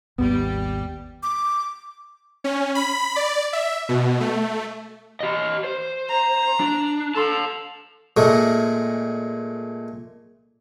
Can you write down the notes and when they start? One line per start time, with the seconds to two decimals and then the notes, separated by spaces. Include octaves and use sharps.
0.18 G#1 D#2 G3 B3 G4
1.23 D6
2.44 C#4
2.75 B5
3.16 D5
3.53 E5
3.89 B2
4.20 A3
5.20 G4 D#5
5.64 C5
6.09 A#5
6.60 D4
7.15 A4 A5 C6
8.17 A#2 G#3 A3